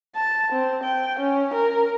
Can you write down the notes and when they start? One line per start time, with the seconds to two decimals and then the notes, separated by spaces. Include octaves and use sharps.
0.16 A5
0.52 C4
0.83 G5
1.19 C#4
1.54 A#4